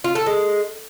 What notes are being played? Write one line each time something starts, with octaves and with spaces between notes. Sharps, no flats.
F4
A4
G#3